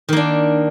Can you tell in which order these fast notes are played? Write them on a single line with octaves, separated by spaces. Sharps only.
D#3 A#3 D4